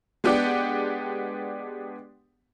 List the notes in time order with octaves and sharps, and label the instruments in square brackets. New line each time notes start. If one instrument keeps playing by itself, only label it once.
[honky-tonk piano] G#3 B3 D4 G4 D5 F#5